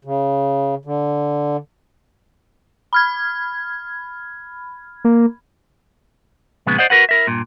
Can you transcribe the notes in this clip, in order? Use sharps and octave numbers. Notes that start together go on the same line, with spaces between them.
C#3
D3
B5 F6 G#6
A#3
A#2 C#3 F3 G#3 B3
C5 D5 D#5 F#5
F#4 G#4 A#4 B4 F#5
E4 A#4 E5
G2 A#2